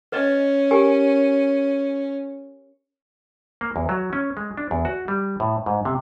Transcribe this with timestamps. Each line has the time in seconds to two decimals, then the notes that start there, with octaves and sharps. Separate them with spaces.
0.12 C#4 B4 D5 D#5
0.71 G4 A#4 G#5
3.61 A#3
3.76 E2
3.89 F#3
4.13 C#4
4.37 G#3
4.57 D4
4.71 E2
4.85 F#4
5.08 G3
5.40 A2
5.66 G#2
5.85 C3